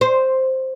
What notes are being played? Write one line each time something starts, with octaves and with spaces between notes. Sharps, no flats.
C5